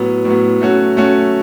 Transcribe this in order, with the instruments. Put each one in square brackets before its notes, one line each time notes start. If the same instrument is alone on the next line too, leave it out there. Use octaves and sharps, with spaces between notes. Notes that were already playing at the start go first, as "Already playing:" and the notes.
Already playing: [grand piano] A2 F#3 B3
A2 F#3 B3
F#3 A3 C#4 F#4
F#3 A3 C#4 F#4